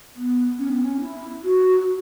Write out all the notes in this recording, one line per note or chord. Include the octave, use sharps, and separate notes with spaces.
B3
C#4
B3
C#4
E4
F#4